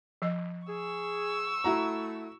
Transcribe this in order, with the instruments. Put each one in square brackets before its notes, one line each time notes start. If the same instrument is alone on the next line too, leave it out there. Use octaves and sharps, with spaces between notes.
[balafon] F3 D#5
[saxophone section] G#4 [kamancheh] C#6 E6
[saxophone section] A3 [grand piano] E4 F#4 A#5